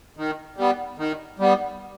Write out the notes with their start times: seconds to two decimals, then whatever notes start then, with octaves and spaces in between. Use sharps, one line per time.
0.17 D#3
0.57 G3 B3
0.98 D#3
1.39 G3 B3